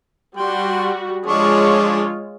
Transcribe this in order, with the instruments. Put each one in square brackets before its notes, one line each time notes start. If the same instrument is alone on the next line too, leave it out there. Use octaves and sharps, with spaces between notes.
[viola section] G3 F#4 [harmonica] G5 C6
[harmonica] F3 D4 C#6 [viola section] G#3 F4 C#5